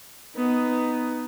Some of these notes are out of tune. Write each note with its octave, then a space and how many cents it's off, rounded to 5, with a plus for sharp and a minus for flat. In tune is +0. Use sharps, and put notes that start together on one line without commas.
B3 +10 D#4 +0